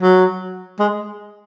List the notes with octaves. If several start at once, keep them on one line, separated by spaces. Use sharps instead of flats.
F#3
G#3